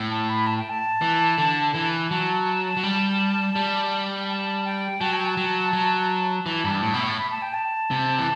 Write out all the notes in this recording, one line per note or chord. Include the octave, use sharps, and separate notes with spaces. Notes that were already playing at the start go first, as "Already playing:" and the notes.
Already playing: A2
A5
B5
A5
G5
A5
E3
D3
E3
F#3 A5
F#3
G3
G3
A5
G5
F#3 A5
G5
A5
F#3
F#3
E3 A5
G2 B5
A5
A2
B2 B5
A2
B5
A5
G5
A5
C3
E3